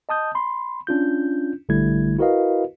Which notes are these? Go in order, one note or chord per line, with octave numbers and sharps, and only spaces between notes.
D#5 A5 D#6 G6
B5 C6
C#4 D4 F4 G6
A#1 D3 G3 A3 E4 G#6
E4 F#4 A#4 B4 D#5 F5